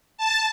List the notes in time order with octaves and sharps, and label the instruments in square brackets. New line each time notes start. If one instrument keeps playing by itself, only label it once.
[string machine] A5